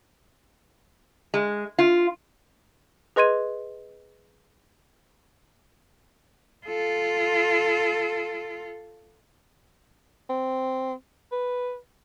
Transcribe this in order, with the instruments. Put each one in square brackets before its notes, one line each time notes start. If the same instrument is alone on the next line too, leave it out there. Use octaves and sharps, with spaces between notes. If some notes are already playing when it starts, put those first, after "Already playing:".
[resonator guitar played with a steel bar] G#3
F4
[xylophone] G#4 B4 D#5 C6 G#6 D#7
[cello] F4 A4
[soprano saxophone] C4
B4